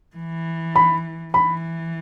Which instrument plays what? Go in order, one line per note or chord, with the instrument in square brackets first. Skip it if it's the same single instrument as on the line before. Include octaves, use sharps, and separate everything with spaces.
[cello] E3
[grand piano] B5
[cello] E3 [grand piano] B5